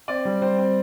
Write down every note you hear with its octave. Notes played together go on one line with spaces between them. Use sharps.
C4 D5
G3
G3 C5
C4